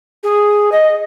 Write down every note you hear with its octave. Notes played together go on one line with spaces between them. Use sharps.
G#4
D#5